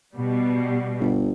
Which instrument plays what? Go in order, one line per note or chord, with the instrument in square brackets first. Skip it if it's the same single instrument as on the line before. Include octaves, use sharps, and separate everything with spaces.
[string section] B2 G3
[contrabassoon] G1